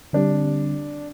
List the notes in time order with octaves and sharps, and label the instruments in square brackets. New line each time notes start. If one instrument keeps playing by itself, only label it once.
[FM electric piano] D3 G3 C4 G4 [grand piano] D4